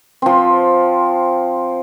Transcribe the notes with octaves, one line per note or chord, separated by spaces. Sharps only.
F3 C4